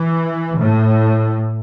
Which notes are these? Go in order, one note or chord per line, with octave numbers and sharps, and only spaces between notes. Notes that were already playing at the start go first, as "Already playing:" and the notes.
Already playing: E3
A2